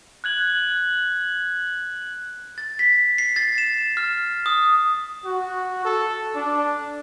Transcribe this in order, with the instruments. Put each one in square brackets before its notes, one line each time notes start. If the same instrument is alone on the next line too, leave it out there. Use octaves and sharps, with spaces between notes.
[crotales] F#6 G#6 F#7
[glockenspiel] A6
B6
C7
A6
E7
F6
D#6
[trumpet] F#4
A4
D4